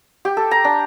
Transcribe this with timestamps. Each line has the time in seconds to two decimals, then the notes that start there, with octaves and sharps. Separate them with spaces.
0.25 G4
0.37 A4
0.51 A#5
0.64 D4